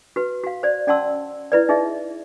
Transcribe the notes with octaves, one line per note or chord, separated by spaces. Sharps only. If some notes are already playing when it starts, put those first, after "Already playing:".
F#4 B4
F#4 F5
C5 D5
C#4 D5 F#5 A5 C6 E6
E4 B4 D5
D#4 G#4 D#5 E5